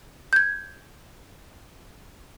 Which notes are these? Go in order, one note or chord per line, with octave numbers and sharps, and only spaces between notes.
G6 G#6